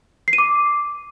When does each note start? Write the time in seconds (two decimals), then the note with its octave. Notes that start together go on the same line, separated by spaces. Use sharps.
0.28 C7
0.33 D#7
0.38 D6